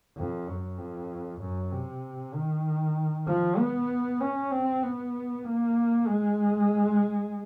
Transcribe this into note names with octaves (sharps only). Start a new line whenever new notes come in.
F2
F#2
F2
F#2
C3
D#3
F3
B3
C#4
C4
B3
A#3
G#3